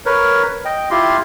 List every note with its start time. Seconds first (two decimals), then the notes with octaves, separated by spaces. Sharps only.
0.06 A#4 B4 C#5
0.65 D#5 G5
0.91 E4 F4 G4 C6